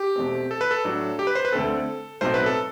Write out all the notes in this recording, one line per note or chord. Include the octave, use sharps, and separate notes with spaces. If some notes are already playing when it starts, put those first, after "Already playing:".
Already playing: G4
E2 B2 A3 C4
A4
B4
A4
A2 F#3 A3 D4
G4
B4
C5
B4
D2 D3 A3 C4 A4
B1 A2 F#3 A3 C4 C5
B4
A4